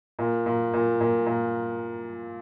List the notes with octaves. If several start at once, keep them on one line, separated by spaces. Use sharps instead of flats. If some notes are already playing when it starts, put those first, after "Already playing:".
A#2
A#2
A#2
A#2
A#2